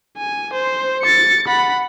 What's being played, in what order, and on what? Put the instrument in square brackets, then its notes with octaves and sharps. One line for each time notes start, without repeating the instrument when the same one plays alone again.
[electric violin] G#5
C5
A6 C#7
F#5 B5